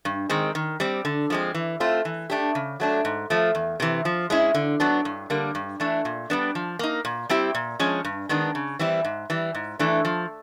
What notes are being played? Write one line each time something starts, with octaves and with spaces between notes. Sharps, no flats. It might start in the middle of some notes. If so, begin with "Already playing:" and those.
G2
D#3 G#3 C4
D#3
G3 C4
D3
F3 G#3 C4
E3
A3 C4 F4
E3
A3 D4 G4
C#3
F#3 A3 D4
G#2
F3 A3
E2
C3 E3
F3
G#3 C#4 E4
D3
F#3 B3 D4
G2
D3 G3 A#3
G2
E3 A3 D4
A#2
G3 B3 D4
F3
A#3 D#4
A#2
G3 C4 E4 G4
A#2
F3 G#3 C#4
G2
D#3 G#3 B3 D4
C#3
E3 G3 C4 E4
G#2
E3 G3
G#2
E3 A3 D4
F3